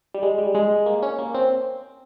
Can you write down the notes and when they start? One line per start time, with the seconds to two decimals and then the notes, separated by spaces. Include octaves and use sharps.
0.14 G3
0.23 G#3
0.38 G3
0.55 G#3
0.86 A#3
1.03 C#4
1.19 A#3
1.35 C4